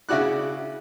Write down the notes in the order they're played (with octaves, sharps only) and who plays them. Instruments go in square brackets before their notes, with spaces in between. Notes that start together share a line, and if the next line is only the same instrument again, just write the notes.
[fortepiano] C#3 E4 F#4 D5 F#6